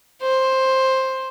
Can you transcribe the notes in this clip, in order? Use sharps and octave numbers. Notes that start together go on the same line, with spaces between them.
C5